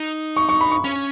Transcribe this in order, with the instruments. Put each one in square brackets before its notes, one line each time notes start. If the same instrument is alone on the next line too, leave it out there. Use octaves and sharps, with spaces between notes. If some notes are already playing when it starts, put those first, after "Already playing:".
Already playing: [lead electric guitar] D#4
[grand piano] C#6
C#6
B5
C#6
[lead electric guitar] C#4